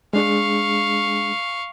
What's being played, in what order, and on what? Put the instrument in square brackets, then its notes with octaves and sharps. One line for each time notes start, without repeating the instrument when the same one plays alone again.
[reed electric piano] G#3 D4 G#4 [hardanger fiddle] F5 C#6